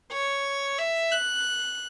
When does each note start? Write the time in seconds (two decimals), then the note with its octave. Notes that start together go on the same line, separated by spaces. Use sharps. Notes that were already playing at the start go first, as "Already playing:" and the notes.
0.12 C#5
0.78 E5
1.12 F#6